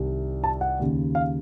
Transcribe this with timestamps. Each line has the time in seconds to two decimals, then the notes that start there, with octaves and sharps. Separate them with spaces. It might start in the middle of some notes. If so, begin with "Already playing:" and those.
Already playing: C2 C3 D#3
0.44 A5
0.61 F#5
0.79 D#2 C#3
1.15 F5